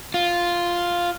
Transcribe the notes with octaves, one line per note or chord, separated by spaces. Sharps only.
F4